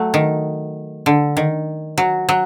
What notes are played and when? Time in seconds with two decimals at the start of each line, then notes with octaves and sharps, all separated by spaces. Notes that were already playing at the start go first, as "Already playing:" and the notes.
Already playing: F#3 A3
0.14 D#3
1.06 D3
1.37 D#3
1.98 F#3
2.29 F#3